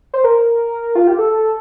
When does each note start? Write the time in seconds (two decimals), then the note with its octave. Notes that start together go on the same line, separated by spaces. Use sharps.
0.14 C5
0.24 A#4
0.95 F4
1.07 G4
1.19 A4